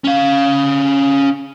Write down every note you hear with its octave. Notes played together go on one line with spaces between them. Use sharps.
C#4 F5